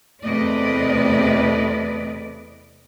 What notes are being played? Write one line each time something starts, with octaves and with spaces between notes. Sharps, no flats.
E2 C3 A3 B4 D5 D#5